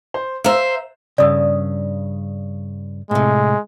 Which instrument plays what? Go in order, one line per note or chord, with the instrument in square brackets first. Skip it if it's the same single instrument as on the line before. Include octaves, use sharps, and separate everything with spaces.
[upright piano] C5
[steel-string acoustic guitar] C5 E5 [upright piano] F5 A#5 E6
[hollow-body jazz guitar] G2 C#3 [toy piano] D5 D#6 E6
[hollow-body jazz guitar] A2 C3 [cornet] G#3